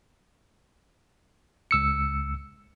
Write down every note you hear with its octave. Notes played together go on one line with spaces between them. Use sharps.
C#2 E6 C#7